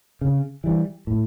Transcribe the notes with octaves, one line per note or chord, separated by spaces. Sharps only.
C#3
E3 G3
A2